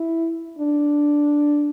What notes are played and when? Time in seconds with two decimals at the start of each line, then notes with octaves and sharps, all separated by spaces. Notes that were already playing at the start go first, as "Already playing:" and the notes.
Already playing: E4
0.58 D4